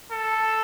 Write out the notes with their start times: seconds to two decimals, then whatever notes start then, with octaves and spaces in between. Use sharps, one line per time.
0.11 A4